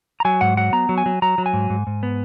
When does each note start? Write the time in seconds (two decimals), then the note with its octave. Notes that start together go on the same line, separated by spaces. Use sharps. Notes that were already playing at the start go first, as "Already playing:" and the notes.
0.20 A#5
0.25 F#3 G#5
0.41 G#2 F#5
0.57 F#3 F#5
0.73 B3 A#5
0.89 F#3
0.98 G#5
1.06 F#3
1.22 F#3 A#5
1.38 F#3
1.46 G#5
1.53 G#2
1.70 G#2
1.87 G#2
2.03 B3